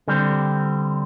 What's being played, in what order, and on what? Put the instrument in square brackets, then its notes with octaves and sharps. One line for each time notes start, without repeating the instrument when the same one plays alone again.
[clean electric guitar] D3 G3 C4